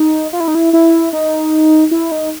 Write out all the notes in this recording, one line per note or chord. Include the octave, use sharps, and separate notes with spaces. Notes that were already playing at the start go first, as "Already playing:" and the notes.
Already playing: D#4
F4
E4
D#4
E4
E4
D#4
E4
D#4